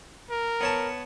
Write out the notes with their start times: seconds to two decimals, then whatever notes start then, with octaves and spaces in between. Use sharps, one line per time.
0.30 A#4
0.61 B3 C#5 A5